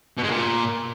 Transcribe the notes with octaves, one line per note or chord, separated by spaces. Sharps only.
B2
G#3
A#2